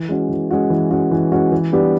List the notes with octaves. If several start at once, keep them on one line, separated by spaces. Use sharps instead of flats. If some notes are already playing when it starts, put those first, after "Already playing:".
Already playing: E3
G#3 C#4 F#4
E3
G#3 C#4 F#4
E3
G#3 C#4 F#4
E3
G#3 C#4 F#4
E3
G3 B3 D4 G4